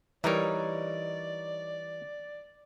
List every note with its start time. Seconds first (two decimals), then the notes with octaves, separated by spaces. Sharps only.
0.24 E3 G3 D#4 A#4 C#5 D5